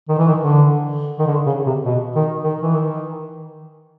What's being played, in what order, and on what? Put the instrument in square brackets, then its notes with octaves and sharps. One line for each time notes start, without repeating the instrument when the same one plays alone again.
[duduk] D#3
E3
D#3
D3
D#3
D3
C#3
C3
B2
D#3
D#3
E3
D#3